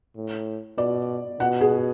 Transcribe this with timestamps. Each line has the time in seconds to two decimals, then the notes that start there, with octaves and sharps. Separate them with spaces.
0.16 A2
0.77 B2 D5
1.40 B2 F#5
1.61 G#4